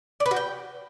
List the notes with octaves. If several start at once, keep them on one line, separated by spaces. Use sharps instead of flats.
D5
B4
F#4
G5